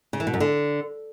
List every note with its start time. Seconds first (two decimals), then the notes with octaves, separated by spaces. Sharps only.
0.13 C#3
0.20 E3
0.27 B2
0.34 F#2
0.40 D3